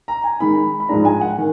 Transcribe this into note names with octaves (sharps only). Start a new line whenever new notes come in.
A#5
G#5
D#3 G#3 D#4 B5
B5
G#2 F3 G#3 D4 A#5
G#5
F#5
D#3